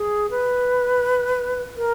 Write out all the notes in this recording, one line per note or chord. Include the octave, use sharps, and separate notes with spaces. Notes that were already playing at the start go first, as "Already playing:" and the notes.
Already playing: G#4
B4
A#4